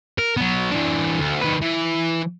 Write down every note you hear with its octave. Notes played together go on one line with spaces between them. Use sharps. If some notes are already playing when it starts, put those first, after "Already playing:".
A#4
F#3 B3
E3 D4
D2
D#3 B4
E3